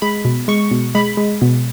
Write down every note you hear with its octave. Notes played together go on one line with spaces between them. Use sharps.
G#3 B5
B2
G#3 C#6
B2
G#3 B5
G#3
B2